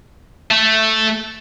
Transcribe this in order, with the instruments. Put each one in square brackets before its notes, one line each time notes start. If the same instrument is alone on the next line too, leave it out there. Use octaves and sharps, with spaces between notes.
[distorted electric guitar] A3